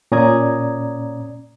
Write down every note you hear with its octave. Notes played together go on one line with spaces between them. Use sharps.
A#2 C#4 D5 A#5 D#6 G#6